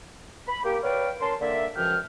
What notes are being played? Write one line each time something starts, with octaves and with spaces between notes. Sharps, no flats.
B5
A#3 G4
B4 C#5 D5 F5 G5
C#4 A#4 A5 C6
D3 A#3 D5 E5
C#2 F#2 F3 G5 F6